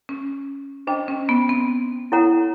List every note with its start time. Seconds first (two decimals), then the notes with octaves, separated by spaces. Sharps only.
0.09 C#4
0.87 D4 C5 D#5 G5 A#5
1.08 C#4
1.29 B3
1.49 C4
2.12 E4 A4 C#5 F#5 A#5